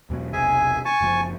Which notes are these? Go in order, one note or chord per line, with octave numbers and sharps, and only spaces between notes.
E2 B2 F#3
E1 B1 C3 G#4 E5 G#5
G#5 A5 C#6
F#1 F3